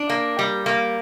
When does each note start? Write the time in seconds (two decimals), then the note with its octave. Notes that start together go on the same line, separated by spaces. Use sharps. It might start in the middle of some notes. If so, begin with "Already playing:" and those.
Already playing: D4
0.10 A#3
0.39 G3
0.66 A#3